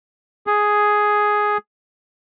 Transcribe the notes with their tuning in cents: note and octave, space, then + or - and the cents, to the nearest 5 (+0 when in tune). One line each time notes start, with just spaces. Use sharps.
G#4 +5